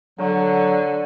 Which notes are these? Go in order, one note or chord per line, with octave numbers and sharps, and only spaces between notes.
D3 F#3